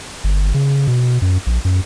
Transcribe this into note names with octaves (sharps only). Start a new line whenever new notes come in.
G1
C#3
B2
F#2
A#1
F#2